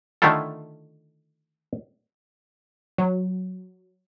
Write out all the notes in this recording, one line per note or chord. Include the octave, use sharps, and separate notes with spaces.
D3 D#3 A3 E4 F4 A4
F#3